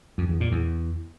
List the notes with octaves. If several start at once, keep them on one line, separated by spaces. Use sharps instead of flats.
F2
E2
A#2
E2